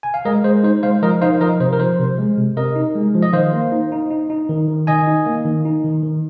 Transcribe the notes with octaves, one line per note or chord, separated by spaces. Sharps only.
G#5
F5
G#3 A#4 D#5
G#3 C5
D#4 C5
G#3 C5 F5
F3 A#4 D#5
D#4 C5 F5
F3 A#4 D#5
C3 C5
A#4
F3 C5
C3
G#3
C3
C3 A#4 D#5
D#4
G#3
F3
D#5
D#3 C5 F5
A#3
D#4
D#4
D#4
D#4
D#3
D#3
D#3 D#5 G#5
D#4
A#3
D#3
D#4
D#3
D#3